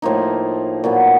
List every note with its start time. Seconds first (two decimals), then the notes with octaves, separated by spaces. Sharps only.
0.02 A2 F3 A#3 D#4
0.84 A#2 F#3 B3